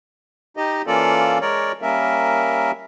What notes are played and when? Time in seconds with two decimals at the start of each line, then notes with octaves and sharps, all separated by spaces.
0.57 D#4 G4 D#5
0.87 E3 A#3 C#4 F4 A4 D5
1.41 G#3 A#4 C#5 D5
1.82 G3 A#3 C#4 A#4 E5